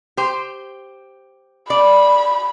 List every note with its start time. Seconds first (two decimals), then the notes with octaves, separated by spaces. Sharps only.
0.17 G4 C5
1.70 D5 B5